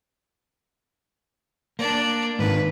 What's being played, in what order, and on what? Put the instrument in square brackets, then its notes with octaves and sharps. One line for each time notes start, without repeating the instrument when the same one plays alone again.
[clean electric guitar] A#3 [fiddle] D4 D5
[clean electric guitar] G#2 D#3 D4 [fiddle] B4